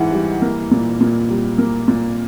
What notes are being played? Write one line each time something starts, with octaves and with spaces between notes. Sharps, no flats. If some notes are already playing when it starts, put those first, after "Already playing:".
Already playing: G#1 G#2 E3 F#5
G3
A#3
A#2
A#2
G3
A#3
A#2